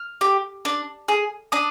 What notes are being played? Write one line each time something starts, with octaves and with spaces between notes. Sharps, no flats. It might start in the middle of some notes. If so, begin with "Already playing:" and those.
Already playing: F6
G4
D4
G#4
D4 D#6